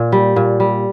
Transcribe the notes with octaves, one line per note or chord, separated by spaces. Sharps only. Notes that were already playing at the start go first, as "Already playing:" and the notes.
Already playing: A#2
G3
A#2
G3